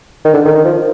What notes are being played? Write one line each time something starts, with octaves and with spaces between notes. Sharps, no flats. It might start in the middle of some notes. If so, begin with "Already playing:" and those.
D#3
D3
D#3
D#3
F3